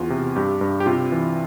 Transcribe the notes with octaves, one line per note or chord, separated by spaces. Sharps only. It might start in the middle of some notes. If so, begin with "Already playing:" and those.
Already playing: E2 F4
C3
G2 G4
G2
G4
C3 F4
E3